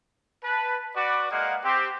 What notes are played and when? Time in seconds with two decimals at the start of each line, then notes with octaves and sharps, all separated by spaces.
0.44 B4 A5
0.95 F#4 B4 D5
1.31 G#3 A#3 G#4 D#5 F5 F#5
1.64 C4 G4